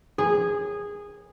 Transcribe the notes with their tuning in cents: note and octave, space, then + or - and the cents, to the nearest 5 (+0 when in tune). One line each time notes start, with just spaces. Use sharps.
G#4 -15